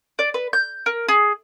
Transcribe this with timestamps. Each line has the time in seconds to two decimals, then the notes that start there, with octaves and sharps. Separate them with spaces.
0.19 D5
0.34 B4
0.53 G6
0.86 A#4
1.08 G#4